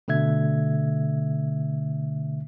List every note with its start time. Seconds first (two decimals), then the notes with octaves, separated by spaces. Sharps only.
0.08 B2 D3 A3 E5 G#6